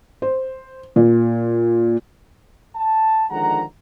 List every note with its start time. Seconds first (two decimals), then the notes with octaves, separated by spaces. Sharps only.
0.22 C5
0.96 A#2
2.75 A5
3.31 D3 D#3 F3 G#3 F#5 A#5